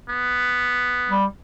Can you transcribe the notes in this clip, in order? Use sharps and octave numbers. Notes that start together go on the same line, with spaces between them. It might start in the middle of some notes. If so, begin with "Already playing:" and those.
B3
G3